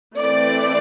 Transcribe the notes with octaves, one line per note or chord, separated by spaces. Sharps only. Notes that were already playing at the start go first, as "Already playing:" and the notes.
E3 A3 C4 D5